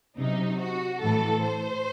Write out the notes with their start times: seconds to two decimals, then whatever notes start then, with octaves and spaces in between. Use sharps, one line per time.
0.17 C3 F#3 D#4
0.58 F#4
1.00 A2 E3 A4
1.42 C5